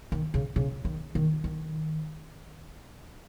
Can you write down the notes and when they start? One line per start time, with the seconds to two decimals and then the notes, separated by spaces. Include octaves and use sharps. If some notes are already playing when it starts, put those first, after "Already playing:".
0.12 D#3
0.34 C#3
0.56 C#3
0.85 D#3
1.15 D#3
1.44 D#3